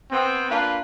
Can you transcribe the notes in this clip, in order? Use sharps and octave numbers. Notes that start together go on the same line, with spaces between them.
B3 C4
A#3 D4 F4 B4